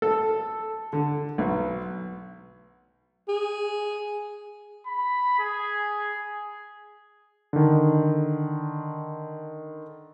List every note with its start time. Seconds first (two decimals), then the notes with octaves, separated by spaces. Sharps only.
0.02 A4
0.93 D3
1.38 B1
3.29 G#4
4.87 B5
5.39 G#4
7.53 D3 D#3